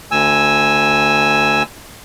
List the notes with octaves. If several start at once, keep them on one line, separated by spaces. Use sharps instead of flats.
D2 G#5 E6